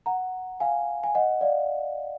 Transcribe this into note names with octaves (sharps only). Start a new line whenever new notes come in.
F#5 A#5
F5 G#5
G#5
D#5 F#5
D5 F5